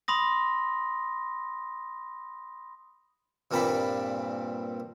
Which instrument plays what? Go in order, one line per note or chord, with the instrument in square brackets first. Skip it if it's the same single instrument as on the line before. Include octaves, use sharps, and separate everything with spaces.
[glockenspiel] B5 C6 D#6 A#6
[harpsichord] G2 A#2 C4 D4 A4 B5